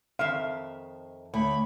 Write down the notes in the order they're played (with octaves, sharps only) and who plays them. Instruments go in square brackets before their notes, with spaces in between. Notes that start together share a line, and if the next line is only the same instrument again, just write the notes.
[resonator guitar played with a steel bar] F2 D#3 E5 [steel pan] F5
[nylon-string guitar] D2 [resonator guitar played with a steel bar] C#5 [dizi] B5